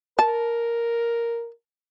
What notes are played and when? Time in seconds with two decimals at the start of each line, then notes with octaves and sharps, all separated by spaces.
0.19 A#4 A5